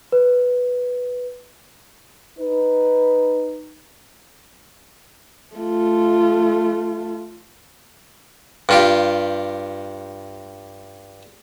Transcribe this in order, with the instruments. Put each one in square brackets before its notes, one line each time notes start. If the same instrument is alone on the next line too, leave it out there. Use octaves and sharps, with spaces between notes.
[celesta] B4
[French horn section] D#4 B4
[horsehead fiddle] A3 F4
[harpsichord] G2 F4 G4